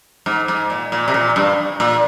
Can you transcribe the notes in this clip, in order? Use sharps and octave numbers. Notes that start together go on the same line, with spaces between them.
G#2
G#2
A#2
A#2
C3
A#2
G2
A#2